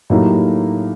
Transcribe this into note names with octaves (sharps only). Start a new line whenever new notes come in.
A2 F#3 A#3 D#4 G4